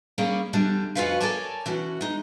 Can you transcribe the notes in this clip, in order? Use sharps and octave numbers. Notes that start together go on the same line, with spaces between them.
G3 A#3 C#4 G#4 C#5 D5
E2 D3 G3 D4
F2 C#4 F4 F#4 B4 F5
A4 A#4 C#5 D5 G#5 A5
E3 C#4 F#4
G#3 D#4